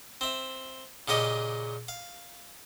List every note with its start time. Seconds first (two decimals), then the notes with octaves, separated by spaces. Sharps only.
0.21 C4 E5
1.08 A#2 C#3 G4 D#5
1.88 F5